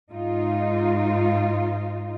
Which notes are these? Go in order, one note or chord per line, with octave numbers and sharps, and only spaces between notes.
G#2 D#4 F4